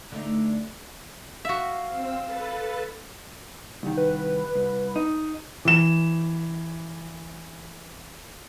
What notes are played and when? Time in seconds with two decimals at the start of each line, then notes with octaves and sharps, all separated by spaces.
0.12 D3 A3 D#4
1.45 F#4 E5 F5
1.89 C4 E6
2.25 A4 B4 A5
3.83 C2 D#3
3.97 B4
4.55 C2
4.96 D#4
5.65 E3 E7